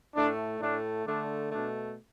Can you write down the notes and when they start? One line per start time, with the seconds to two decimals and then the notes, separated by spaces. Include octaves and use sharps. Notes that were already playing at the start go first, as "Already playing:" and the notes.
0.15 A2 A3 D4
0.60 A2 A3 D4
1.06 D3 A3 D4
1.51 B2 A3 D4